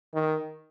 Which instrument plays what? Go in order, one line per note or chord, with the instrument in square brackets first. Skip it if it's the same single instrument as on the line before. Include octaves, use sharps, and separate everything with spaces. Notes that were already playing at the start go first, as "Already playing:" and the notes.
[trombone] D#3